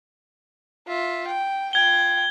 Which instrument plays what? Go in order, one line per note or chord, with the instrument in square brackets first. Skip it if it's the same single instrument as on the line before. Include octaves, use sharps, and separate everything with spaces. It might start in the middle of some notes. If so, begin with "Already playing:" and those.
[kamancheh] F4 E5
G5
[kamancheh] F4 G5 [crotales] G#6 G7